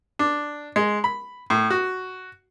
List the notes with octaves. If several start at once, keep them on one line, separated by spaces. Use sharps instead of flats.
D4
G#3
B5
A2
F#4